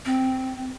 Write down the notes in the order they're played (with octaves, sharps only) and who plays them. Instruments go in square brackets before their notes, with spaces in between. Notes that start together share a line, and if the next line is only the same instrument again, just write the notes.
[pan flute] C4